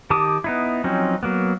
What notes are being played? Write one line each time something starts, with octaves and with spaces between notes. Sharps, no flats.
D#3 G4 A5 D6 D#6
B3 D#4 E4
F3 F#3 C4 C#4 D#4
F#3 A#3 B3